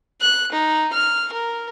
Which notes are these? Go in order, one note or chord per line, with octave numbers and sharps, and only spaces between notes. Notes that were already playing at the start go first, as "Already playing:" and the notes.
F#6
D#4
F6
A#4